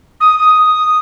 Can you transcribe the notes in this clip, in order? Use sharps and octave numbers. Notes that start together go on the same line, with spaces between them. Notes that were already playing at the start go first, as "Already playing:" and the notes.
D#6
D#6